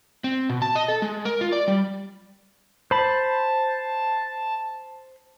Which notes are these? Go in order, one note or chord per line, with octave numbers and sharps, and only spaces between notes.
C4
B2
A5
D#5
A4
G#3
A#4
F4
D5
G3
C5 A5 B5